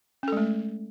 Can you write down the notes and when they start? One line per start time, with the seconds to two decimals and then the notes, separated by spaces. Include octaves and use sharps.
0.23 C#4
0.28 A4
0.32 G#3
0.37 A3